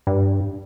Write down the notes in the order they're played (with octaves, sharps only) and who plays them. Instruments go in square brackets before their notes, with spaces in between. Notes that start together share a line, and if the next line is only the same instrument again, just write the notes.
[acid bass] G2